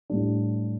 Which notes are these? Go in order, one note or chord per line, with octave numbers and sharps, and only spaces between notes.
A2 G3 D4